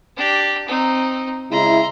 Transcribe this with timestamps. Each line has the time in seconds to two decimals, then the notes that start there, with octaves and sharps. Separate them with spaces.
0.17 D4 G4
0.68 C4 D#4
1.51 C#3 G#3 E4 A#5 C6